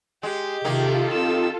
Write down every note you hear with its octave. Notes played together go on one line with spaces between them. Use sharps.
G#3 G4
C3 D#3 A#3 F4 A4
C4 G4 E6